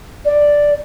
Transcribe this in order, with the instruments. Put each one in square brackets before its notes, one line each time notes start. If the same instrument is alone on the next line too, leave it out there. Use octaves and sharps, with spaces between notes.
[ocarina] D5